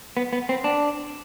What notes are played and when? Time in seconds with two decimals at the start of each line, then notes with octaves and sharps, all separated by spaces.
0.17 B3
0.33 B3
0.49 C4
0.64 D4